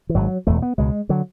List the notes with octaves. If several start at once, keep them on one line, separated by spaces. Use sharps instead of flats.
E3
G#1 G#2 F#3
E1 E2 B2 A3
B3
C#2 B2 G#3
D3 F#3